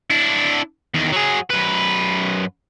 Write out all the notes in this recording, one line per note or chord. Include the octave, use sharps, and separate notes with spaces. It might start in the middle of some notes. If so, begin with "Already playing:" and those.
D4 E4
E2 D#3
F#3 G#4
F#2 B4